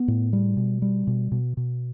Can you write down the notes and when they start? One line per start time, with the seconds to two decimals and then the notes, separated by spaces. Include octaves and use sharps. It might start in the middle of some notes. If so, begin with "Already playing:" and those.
Already playing: B3
0.08 A2
0.33 G3
0.57 B2
0.82 G3
1.07 B2
1.32 B2
1.57 B2